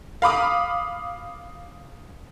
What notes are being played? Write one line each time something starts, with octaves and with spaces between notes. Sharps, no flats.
F5 B5 D6 D#6